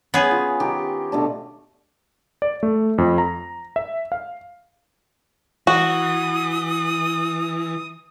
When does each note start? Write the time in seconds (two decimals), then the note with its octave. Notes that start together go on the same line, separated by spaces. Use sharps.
0.14 B3 C#4 G#4 F#5 G#5
0.31 F4
0.60 D#3 G4
1.12 B2 A3 D4
2.42 D5
2.63 A3
2.98 F2
3.18 A#5
3.76 E5
4.12 F5
5.67 E3 F#4 D#6